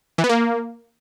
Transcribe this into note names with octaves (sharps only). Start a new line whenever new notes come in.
E3
B3
A#3